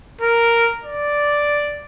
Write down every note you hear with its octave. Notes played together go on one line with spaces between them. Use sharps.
A#4
D5